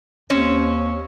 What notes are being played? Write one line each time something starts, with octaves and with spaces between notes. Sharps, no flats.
D#2 C4 C#4 C#5